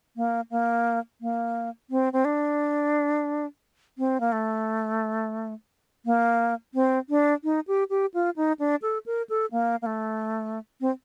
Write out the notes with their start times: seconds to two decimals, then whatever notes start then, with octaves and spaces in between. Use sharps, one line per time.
0.17 A#3
0.51 A#3
1.21 A#3
1.90 C4
2.13 C4
2.25 D4
3.98 C4
4.20 A#3
4.32 A3
6.05 A#3
6.74 C4
7.10 D4
7.44 D#4
7.68 G4
7.90 G4
8.14 F4
8.36 D#4
8.59 D4
8.82 A4
9.06 A#4
9.30 A4
9.52 A#3
9.82 A#3
9.86 A3
10.81 C4